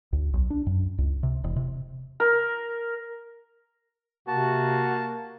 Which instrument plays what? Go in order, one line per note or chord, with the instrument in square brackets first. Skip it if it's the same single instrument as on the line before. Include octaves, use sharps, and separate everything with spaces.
[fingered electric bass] D2
B1
D4
F#2
C#2
C3
E1
C3
[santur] A#4
[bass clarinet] C3 [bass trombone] A#3 [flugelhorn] F#4 [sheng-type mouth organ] A5